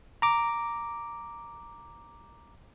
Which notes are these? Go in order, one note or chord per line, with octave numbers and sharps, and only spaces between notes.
A#5 D6